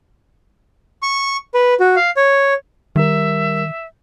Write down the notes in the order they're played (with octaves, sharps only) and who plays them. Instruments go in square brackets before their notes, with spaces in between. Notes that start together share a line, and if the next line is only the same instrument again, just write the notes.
[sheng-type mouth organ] C#6
B4
F#4
F5
C#5
[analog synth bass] D#3 [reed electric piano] G3 A#4 [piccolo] E5